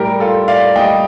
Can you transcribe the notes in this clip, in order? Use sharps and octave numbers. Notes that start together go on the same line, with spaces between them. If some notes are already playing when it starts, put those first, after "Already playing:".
Already playing: A2 G3 G4 A#4
F4 A4
D5 F5
A2 G3 D#5 G5